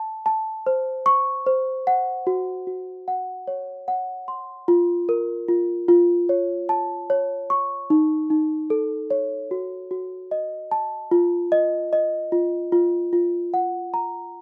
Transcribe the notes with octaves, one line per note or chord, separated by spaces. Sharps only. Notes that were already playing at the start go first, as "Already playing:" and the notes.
Already playing: A5
A5
C5
C#6
C5
F#5
F#4
F#4
F#5
C#5
F#5
C6
F4
A#4
F4
F4
C#5
A5
C#5
C#6
D#4
D#4
A4
C#5
F#4
F#4
D#5
A5
F4
D#5
D#5
F4
F4
F4
F#5
A#5